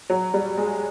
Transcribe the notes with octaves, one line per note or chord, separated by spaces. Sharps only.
F#3
G3
G#3